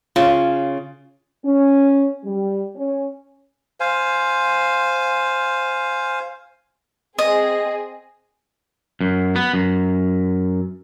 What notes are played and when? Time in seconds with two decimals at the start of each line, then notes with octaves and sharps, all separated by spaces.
0.16 C#3 F4
1.45 C#4
2.24 G3
2.76 C#4
3.80 C5 F5 G#5
7.19 C4 G#4 D#5
9.01 F#2
9.36 B3
9.54 F#2